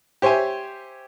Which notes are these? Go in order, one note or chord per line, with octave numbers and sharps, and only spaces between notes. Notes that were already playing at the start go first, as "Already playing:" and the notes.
G4 C5 C#5 E5 G#5